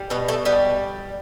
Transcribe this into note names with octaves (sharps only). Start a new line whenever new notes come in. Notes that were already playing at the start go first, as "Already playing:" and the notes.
Already playing: G3
B2 B3
A3
G3 B3